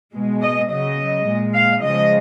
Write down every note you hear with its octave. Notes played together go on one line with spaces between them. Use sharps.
B2 G#3
D#5
C#3 F#3 D#5
A#2 G#3
F5
C#3 F3 G#3 D#5